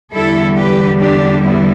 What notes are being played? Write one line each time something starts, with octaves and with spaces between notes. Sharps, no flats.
E2 D3 G3 E4 A4
G4 B4
D4 G4
B3 E4